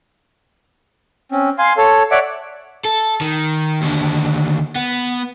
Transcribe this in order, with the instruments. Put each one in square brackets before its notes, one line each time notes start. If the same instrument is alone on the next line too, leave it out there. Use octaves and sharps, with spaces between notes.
[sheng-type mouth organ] C4 C#4
F5 G#5 C6
A4 C#5
C#5 D5 E5 F#5 D6
[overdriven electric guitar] A4
D#3
D#2 D3
B3